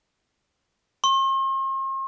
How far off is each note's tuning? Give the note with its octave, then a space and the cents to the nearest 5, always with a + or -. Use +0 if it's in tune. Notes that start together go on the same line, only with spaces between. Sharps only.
C6 +45